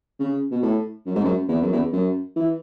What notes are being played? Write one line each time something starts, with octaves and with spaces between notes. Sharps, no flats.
C#3
B2
A2
F#2
G#2
F#2
E2
F#2
E2
F#2
E3